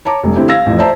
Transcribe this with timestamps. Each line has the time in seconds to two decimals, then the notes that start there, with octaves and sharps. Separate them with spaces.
0.05 C#5 A5 A#5 D6
0.24 F1 G2
0.36 D3 C4 E4 G4
0.48 F5 E6 G#6 A#6
0.66 A1 F2
0.79 C5 D5 E5 A5 A#5